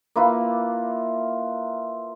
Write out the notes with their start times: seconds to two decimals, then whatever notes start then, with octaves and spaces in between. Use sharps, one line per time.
0.16 A#3 E4 F4 B4